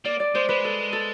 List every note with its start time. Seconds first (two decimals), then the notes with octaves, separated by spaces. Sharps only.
0.05 A#3 D5
0.20 D5
0.35 G#3 C5
0.49 G#3 B4
0.64 A4
0.93 A4